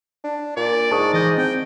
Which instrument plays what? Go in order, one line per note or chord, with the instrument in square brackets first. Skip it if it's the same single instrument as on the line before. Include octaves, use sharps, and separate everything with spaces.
[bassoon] D4
[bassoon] A#2 [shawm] D5
[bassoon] G#2 [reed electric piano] A5 C#6 D#6
[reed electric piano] E3 G6 [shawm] D#5
[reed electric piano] C4 [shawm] G5